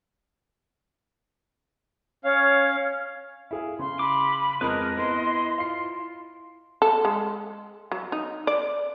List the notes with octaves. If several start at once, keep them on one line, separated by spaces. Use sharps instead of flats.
C#4 C#5 F5
E4 G#4 F5
C#3 C6
B5 D6
F2 G#3 G#4 A#4 B4 D#5
B3 E4 C6
F4 F5 C7
A4
G#3
F#3
D#4
D5